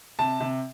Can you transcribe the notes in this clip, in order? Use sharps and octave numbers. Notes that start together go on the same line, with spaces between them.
C3 A5
C3